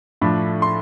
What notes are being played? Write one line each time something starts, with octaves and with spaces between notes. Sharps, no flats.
A2 F3 A3 D4 B5
C6